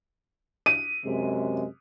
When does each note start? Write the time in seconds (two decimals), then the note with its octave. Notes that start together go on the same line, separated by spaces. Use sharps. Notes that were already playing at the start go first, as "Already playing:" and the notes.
0.66 D#7
1.06 F#2 C3 G#3